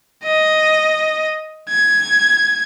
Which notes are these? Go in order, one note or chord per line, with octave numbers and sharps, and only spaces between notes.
D#5
G#6